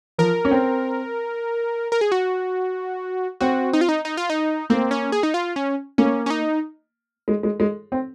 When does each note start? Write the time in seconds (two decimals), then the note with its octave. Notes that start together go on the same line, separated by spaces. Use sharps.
0.18 F3 A#4
0.45 C#4
0.51 C4
1.92 A#4
2.01 G#4
2.12 F#4
3.41 C4 F#4
3.73 D#4
3.81 F4
3.89 D#4
4.05 D#4
4.17 F4
4.30 D#4
4.70 A#3 C4
4.91 C#4
5.12 G#4
5.23 D#4
5.34 F4
5.56 C#4
5.98 A#3 C#4
6.26 C#4
6.30 D#4
7.28 G#3
7.43 G#3
7.60 G#3
7.92 C4